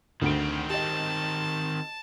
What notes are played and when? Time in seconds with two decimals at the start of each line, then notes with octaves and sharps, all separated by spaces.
0.22 D2 D3 D#3 C4 D7
0.70 G4 D#5 A5